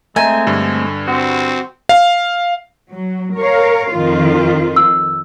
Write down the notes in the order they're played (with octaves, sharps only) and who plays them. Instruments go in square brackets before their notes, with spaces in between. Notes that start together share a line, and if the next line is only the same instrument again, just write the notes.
[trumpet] G#3 [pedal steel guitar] A3 C4 [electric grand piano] D#5 E5 A#5 [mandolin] G#5
[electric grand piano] G2 D3
[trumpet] C4 [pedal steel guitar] F#4
[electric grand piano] F5
[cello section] F#3
A#4 C#5 F5
F2 D#3 F4
[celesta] E6